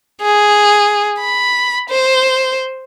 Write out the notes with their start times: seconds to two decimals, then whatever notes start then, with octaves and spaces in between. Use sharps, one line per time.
0.22 G#4
1.20 B5
1.90 C5